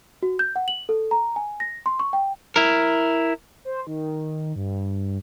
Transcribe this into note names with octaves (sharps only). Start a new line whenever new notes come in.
F#4
G6
F#5
F#7
A4
A#5
G#5
A#6
C6
C#6
G5
E4 A#4
C5
D#3
G2